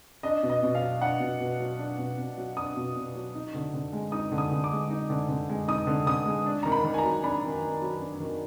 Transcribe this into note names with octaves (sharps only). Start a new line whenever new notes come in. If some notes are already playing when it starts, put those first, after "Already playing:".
D4 D#5
B2
D#5
B2
F5
F#3
D4 F#5
B2
B2
F#3
D4
B2
B2
F#3
D4 D#6
B2
B2
F#3
D#4
D3
D3
G#3
D#4 D#6
D3
D#6
D3
D6
G#3
D#4
D3
D3
G#3
D#4 D#6
D3
D3 D#6
G#3
D4
D#3 A#5
B5
D#3
G#5
A#5
F#3
D4 B5
D#3
D#3
F#3
D4
D#3